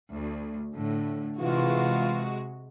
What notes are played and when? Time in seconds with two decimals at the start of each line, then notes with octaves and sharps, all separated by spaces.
0.12 D2
0.75 A2 D3
1.39 C3 E3 G#3 F4 F#4